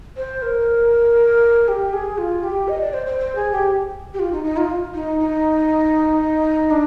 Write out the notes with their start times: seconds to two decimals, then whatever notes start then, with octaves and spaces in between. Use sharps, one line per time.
0.17 C5
0.42 A#4
1.68 G4
1.93 G#4
2.18 F4
2.43 G4
2.68 D#5
2.81 D5
2.93 C5
3.06 C5
3.19 C5
3.35 G#4
3.52 G4
4.14 G4
4.19 F4
4.32 D#4
4.44 D#4
4.57 F4
4.94 D#4
5.20 D#4
6.70 D4